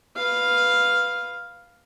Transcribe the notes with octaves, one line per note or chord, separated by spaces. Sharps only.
B4 F5